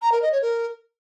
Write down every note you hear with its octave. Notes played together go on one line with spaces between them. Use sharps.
A#5
A#4
D#5
C#5
A#4